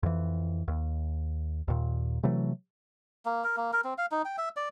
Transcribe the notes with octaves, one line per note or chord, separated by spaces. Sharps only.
F2 E3
D#2
D#2 A#2
C3 E3 F#3 A3
A#3
A#4
A#3
A#4
C4
F5
D#4
G5
E5
D5